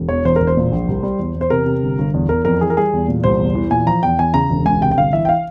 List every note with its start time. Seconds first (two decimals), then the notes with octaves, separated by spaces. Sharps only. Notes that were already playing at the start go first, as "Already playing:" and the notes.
Already playing: E1
0.09 E2 C#5
0.25 E2 C5
0.36 E1 A#4
0.47 C5
0.57 A#2
0.72 A#1
0.88 C2
1.03 G3
1.19 E2
1.35 E2
1.41 C5
1.50 C3 A#4
1.66 C3
1.83 G1
1.99 G1
2.14 E2
2.29 E2 A#4
2.45 F2 A#4
2.61 E3 G#4
2.70 A#4
2.77 G3 G#4
2.93 E2
3.08 A#2
3.24 C2 C5
3.39 E2
3.55 E3
3.71 A#2 G#5
3.87 F3 A#5
4.03 E2 G5
4.19 E2 G#5
4.34 C#3 A#5
4.50 E1
4.65 C#2 G#5
4.81 C3 G5
4.91 G5
4.97 G1 F5
5.13 E3 E5
5.25 G5
5.29 F5